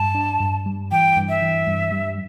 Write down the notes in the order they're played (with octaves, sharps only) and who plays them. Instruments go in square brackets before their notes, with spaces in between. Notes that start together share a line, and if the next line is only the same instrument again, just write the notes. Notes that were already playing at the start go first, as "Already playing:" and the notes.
Already playing: [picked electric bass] G2 [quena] A5
[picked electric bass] D4
G2
G3
[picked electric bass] E3 [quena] G5
[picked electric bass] G2
[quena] E5
[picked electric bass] E3
G2
G3